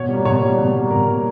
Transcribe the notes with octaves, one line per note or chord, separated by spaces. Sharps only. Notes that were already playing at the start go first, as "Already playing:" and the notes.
Already playing: B2 C#5
G3 A#3
B2 C#5
G3 A#3
B2
G3 A#3
B2 A#4
G3 A#3